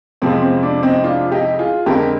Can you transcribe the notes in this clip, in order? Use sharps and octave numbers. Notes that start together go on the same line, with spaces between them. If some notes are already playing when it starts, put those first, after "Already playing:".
F2 C3 F3 G#3 C4
C4
D4
C4 D#4
D4 F4
D#4 G4
F4 G#4
F2 D3 G#3 G4 A#4